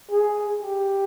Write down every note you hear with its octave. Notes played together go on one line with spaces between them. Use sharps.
G#4
G4